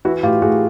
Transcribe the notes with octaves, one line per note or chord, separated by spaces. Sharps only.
E3 E4 F#4
A2 F4 G4
A2 F#4 G#4